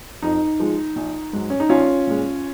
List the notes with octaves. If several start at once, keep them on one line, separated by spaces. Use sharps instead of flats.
F2 D#4
F3 G#3
A#1
G#2 F#3
C#4
D#4
A#1 C#4 F4
A#2 G#3